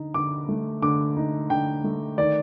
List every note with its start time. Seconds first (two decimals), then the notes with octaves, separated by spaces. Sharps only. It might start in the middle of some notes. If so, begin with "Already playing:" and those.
Already playing: D3 D#4
0.14 D3 D6
0.49 A3
0.82 D3 D6
1.17 D#4
1.50 D3 G5
1.84 A3
2.18 D#3 D5